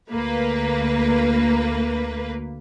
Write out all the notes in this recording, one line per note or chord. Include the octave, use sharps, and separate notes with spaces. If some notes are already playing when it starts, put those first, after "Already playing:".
D2 A#3 B4